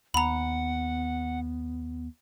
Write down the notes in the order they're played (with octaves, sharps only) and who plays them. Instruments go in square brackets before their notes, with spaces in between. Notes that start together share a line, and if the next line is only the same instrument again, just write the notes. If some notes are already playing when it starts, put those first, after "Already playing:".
[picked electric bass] D#2 [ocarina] B3 [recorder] F#5 [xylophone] A#5 B5